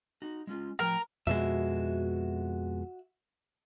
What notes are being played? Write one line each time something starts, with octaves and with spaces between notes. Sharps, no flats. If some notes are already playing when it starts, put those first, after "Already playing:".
D#4 F#4
G#3 C#4 F4
A2 F3 A#4 G5
F2 B2 G#3 F#4 E5